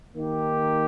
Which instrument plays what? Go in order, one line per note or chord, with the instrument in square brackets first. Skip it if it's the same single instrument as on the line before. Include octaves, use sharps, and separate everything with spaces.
[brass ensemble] D#3 A#3 D#4 G4